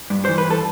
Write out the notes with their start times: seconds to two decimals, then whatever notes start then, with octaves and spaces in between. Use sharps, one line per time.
0.10 G2
0.25 E3 C5
0.38 B4
0.45 G2
0.50 A4